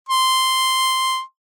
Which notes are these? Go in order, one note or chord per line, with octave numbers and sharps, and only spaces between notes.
C6